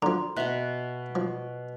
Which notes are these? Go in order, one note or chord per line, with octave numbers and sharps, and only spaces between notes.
D3 F3 A#5 C6
B2 B3 E5 F#6
F3